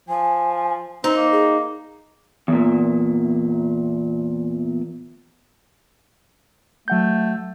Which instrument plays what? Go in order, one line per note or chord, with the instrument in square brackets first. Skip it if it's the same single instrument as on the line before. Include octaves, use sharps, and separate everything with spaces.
[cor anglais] F3 [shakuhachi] G#5
[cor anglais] C4 [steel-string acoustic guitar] D#4 [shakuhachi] C5
[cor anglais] A#3
[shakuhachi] G#4
[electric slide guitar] E2 A#2
[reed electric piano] F#3 F#5 G6 [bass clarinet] A3